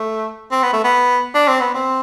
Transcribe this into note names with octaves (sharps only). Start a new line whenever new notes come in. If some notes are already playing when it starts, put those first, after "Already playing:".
Already playing: A3
C4
B3
A3
B3
D4
C4
B3
C4